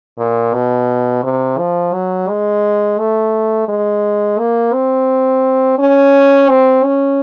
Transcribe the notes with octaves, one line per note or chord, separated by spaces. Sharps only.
A#2
B2
C3
F3
F#3
G#3
A3
G#3
A#3
C4
C#4
C4
C#4